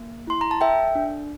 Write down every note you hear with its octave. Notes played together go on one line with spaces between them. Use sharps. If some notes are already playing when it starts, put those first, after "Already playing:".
Already playing: A#3
E4 C6
A#5
A5
A4 E5 G5
D4